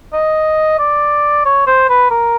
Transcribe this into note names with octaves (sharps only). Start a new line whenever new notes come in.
D#5
D5
C#5
C5
B4
A#4